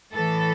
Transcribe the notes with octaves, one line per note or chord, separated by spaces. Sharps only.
A2 E3 A4